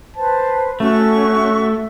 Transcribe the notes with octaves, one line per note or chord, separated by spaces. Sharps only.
B4 C5 A5
A3 C#4 F#4 E5 C#6